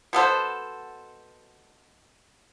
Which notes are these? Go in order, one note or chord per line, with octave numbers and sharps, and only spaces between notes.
B2 B3 A4 C5